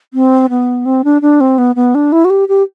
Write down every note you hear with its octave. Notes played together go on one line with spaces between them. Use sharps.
C4
B3
C4
D4
D4
C4
B3
B3
D4
E4
F#4
G4
G4